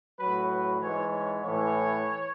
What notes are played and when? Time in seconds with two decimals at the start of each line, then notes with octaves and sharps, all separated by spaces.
0.19 A2 F#3 B4
0.51 B4
0.81 G#2 E3 C#5
1.12 C#5
1.43 A2 E3 C#5